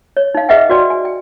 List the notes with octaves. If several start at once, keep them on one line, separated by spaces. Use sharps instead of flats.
C#5
D#4 F5
G#4 B4 D#5 E5 F#5 G5
F#4 B4 D5 G5
G#5
G5